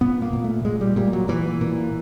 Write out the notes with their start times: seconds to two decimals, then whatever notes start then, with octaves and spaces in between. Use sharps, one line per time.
0.01 A#2 B3
0.22 A#3
0.33 A#2
0.44 A3
0.65 A#2 G#3
0.81 G3
0.96 A#2 G3
1.13 F#3
1.28 A#2 E3
1.61 A#2